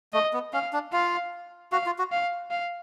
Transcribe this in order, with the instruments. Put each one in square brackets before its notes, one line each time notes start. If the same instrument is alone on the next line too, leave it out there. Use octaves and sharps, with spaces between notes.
[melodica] A3 [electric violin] D#5
[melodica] B3
[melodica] C#4 [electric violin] F5
[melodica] D4
[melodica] F4 [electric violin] F5
[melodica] F#4 [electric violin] F5
[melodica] F4
F#4
[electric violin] F5
F5